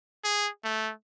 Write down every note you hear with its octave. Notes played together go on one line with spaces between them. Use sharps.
G#4
A3